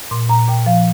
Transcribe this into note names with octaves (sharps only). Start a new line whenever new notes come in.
A#2 C6
A#2 A#5
A#2 G5
F3 F5